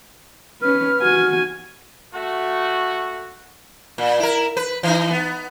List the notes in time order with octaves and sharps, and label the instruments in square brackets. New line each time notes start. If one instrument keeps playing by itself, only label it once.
[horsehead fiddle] C#4 B4 [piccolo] F6
[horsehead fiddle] F#4 G#5
[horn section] A3 F#4
[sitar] A#2
E4 A#4
B4
E3 D#4
B3